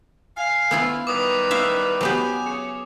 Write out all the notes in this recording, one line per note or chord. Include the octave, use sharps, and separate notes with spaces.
F5 G#5
B3 E4 F4
D#3 G3 B4 D6 D#6
E4 E5 F5
F#3 B3 G4 G#5
C#3 C#5